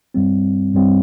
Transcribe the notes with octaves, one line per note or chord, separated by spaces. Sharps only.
G2 G3 C4
G2 G3 C4